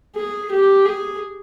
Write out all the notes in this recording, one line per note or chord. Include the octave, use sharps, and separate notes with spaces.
G#4
G4
G#4